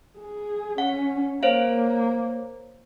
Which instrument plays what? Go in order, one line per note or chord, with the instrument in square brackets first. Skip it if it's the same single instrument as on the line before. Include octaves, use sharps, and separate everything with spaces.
[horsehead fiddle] G#4
[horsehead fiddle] C#4 [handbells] F#5
[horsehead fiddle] A#3 [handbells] C5 C#5 F5